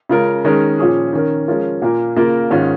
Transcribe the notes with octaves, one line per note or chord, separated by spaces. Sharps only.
C#3 G#3 C#4 F4 A#4
D#3 G#3 C#4 A#4
A#2 F3 C#4 G#4
D#3 C#4 A#4
F3 G#3 C#4 F4 A#4
A#2 A#3 F4 A#4
C#3 A#3 F4 A#4
G#2 D#3 C#4 F4